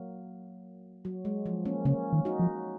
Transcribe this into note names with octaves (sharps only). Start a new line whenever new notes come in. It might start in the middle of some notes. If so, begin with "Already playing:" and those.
Already playing: F#3 A#3
F#3
G#3
F3
A#3 C#4
C#3 A#3 C#4
D#3
D#4 F#4
F3